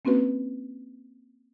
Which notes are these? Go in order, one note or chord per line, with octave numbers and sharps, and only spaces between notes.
A#3 C4 C#4 F#4 B4